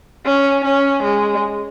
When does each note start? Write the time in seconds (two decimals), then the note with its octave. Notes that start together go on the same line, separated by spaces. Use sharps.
0.26 C#4
0.65 C#4
1.03 G#3